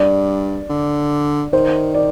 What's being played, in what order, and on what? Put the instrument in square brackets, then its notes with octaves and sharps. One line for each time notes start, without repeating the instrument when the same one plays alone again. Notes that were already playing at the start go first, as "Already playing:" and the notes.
Already playing: [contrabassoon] G2 [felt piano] D5
[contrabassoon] D3
[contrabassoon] D#3 [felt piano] C5
[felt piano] D5